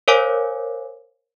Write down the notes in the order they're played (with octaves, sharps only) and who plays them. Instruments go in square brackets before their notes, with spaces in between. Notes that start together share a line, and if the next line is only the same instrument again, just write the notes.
[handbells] A#4 C5 C#5 F5 G#5 D6